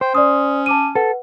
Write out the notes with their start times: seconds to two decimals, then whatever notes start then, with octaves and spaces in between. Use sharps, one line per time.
0.01 C5 G5
0.15 C#4 D5 D#6
0.66 A5 D6 D#7
0.96 A4 B4 F#5